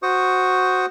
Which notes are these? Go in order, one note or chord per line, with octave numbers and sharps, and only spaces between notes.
F#4 C5 C#6 D#6